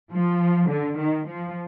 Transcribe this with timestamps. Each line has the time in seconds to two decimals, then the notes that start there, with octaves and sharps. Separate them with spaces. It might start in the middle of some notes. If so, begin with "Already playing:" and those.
0.13 F3
0.70 D3
0.99 D#3
1.28 F3